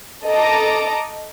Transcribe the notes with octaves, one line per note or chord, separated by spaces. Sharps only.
A4 D#5 A5 A#5 D6